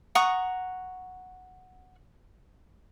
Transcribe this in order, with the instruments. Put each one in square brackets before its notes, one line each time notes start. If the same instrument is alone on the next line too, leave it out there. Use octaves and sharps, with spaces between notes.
[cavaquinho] F#5 A#5 C#6 D#6